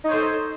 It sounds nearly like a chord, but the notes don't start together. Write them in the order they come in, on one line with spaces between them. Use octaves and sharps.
D#4 C#5 C5 A4